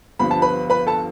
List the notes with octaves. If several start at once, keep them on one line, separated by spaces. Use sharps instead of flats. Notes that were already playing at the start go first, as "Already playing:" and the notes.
G1 G2 F3 B3 B5
A5
B4 B5
B4 B5
A4 A5